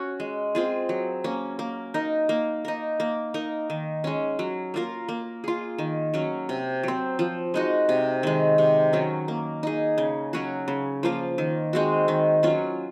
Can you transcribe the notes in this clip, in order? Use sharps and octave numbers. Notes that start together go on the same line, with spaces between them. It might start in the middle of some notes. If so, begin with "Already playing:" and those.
Already playing: C#4 F#4
G#3
C4 F4 G#4
F#3
A#3 C#4
A#3
D#4 A#4
A#3
D#4 A#4
A#3
D#4 A#4
D#3
G#3 C#4
F#3
A#3 F4 A#4
A#3
F4 G#4
D#3
F#3 C#4
C3
F#3 C4
F3
G#3 D#4 F#4
C3
D#3 G#3
C3
D#3 F#3 C#4
A#3
D#4 G#4
C#3
F#3 C#4 F#4
C#3
F3 A#3 F4
D#3
G#3 C4 F#4
D#3
F#3 C#4 F4